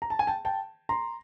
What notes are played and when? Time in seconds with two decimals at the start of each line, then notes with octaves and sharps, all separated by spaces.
0.02 A#5
0.10 A5
0.19 G#5
0.27 G5 A5
0.45 G5 A5
0.89 A#5 C6